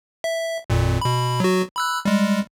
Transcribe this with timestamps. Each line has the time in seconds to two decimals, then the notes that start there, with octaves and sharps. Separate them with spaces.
0.24 E5
0.70 G#1 F2 A#2
1.01 B2 B5
1.40 F#3 F#4
1.76 B5 E6 F#6
2.05 G3 G#3